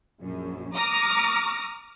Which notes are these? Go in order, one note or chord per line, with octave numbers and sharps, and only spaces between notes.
A#1 F#2
A#5 D6 D#6 F6 A#6